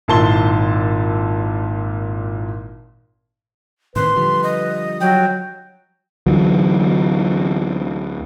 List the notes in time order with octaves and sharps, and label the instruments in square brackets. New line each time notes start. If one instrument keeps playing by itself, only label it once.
[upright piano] G#1 A#2 E4 A5 C6 G7
[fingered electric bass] A2 D#3 C4 [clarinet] B4 [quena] C6
[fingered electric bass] D3 F3 G3
[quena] D#5
[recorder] F#3 [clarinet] G5
[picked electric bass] D2 E3 F#3